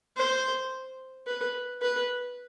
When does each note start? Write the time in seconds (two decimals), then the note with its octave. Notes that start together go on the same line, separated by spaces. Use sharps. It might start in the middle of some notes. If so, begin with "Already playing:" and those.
0.17 C5
1.27 B4
1.82 B4